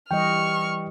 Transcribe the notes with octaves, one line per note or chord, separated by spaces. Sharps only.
E3 G3 D#5 G5 C#6 F6